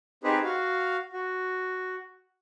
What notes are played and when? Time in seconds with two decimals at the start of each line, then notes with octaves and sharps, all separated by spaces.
0.24 C4 D#4 G4 G#4 B4 C5
0.44 F#4 F5
1.13 F#4